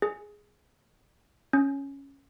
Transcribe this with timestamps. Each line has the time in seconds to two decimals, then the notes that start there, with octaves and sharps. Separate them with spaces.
0.02 G#4
1.53 C#4